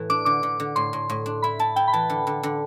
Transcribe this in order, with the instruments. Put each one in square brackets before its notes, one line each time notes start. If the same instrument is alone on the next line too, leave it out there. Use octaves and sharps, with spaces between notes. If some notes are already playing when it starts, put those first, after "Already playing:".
Already playing: [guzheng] A2 E3
[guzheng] D4 [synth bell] D6
[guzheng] D3 [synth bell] D6
[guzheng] D3
D3
[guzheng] A2 [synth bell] C6
[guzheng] A2
A2
D4
[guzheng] E4 [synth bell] B5
[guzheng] E4 [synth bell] A5
[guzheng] E4 [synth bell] G5
[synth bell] B5
[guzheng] E3 [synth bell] A5
[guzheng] D3
D3
D3